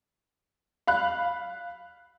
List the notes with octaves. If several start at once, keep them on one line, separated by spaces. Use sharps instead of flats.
F5 B5 F#6